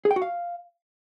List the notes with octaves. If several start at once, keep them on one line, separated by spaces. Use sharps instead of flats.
G#4
G5
F#4
F5